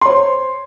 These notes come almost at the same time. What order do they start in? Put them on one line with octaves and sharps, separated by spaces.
C6 C#5 C5